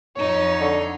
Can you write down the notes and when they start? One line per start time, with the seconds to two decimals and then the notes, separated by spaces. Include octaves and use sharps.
0.16 F2 D#4 C#5
0.61 D3